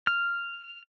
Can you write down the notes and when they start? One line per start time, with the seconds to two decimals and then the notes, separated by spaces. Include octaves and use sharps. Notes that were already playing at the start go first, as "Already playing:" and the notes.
0.07 F6